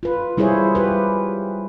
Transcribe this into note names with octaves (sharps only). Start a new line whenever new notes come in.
F4 B4
G3 E4 F4 G#4 C5 C#5
G4 B4